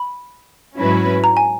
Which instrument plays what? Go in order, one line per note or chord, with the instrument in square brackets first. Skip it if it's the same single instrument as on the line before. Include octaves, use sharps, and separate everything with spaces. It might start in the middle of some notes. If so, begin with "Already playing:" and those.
Already playing: [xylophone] B5
[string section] G#2 F#3 C#4 E4 B4
[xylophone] A#5
G#5